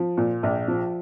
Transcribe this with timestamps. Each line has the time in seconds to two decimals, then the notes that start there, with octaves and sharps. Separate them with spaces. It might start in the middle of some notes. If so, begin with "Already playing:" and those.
Already playing: F3
0.17 A#2
0.43 A#1
0.68 F3